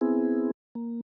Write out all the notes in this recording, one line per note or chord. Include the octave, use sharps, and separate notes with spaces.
B3 C4 E4 G#4
A#3